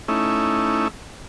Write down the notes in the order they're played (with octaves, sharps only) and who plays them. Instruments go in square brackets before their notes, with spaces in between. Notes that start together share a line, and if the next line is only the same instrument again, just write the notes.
[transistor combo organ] A3 C#4 D#4 E4